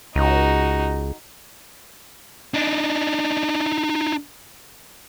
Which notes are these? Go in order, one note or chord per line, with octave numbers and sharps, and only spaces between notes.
C#2 D#4 F#4
D4 D#4